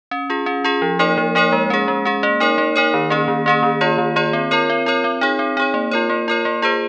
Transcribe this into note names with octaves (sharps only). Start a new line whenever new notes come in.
C#4
F4 G#4
C#4
F4 G#4
F3
A#3 D#4 A#4 C#5
F3
A#3 D#4 A#4 C#5
G#3
C#4 G#4
G#3
C#4 G#4
A#3
D#4 A#4 C#5
A#3
D#4 A#4 C#5
D#3
A#3 C#4 G#4
D#3
A#3 C#4 G#4
D#3
A#3 F4 G#4 C#5
D#3
A#3 F4 G#4 C#5
C4
F4 A#4 C#5
C4
F4 A#4 C#5
C4
D#4 G#4 C#5
C4
D#4 G#4 C#5
A#3
F4 A#4 C#5
A#3
F4 A#4 C#5
A#3
F4 G#4 C5